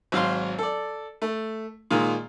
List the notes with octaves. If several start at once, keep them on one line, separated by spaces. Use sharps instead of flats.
G#1 F#3 F5 C6
A4 D5
A3
A#2 D#3 G#3 A#3